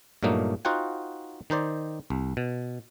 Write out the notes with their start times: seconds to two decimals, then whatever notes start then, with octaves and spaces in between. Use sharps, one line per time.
0.23 G2 A#2 F#3 A3 A#3 D#4
0.65 D#4 F4 F#4 C5 F#5 G5
1.50 D#3 D#4 C5 D5
2.10 C2
2.37 B2